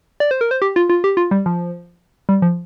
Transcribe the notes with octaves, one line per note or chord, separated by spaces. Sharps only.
D5
C5
A#4
C5
G4
F4
F4
G4
F4
G3
F3
G3
F3